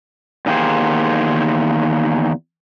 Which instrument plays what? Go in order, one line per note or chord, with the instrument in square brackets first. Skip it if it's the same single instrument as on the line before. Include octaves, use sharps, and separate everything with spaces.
[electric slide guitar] E2 D#3 A#3 G4 G#4 C5